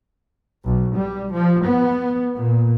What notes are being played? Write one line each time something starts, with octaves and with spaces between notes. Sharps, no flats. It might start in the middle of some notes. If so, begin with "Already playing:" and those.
B1
G3
F3
B3
A#2